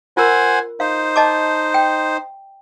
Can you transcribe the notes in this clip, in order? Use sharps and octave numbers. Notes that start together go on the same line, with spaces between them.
F4 A#4 C5 F#5 G#5
D#4 C5 F5
D#5 A5 D6
G5